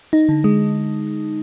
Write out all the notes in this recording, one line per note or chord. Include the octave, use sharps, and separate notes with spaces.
D#4
D3
G#3